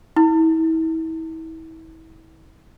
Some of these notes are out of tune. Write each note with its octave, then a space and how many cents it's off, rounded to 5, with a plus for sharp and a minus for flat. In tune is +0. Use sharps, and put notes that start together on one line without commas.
E4 -35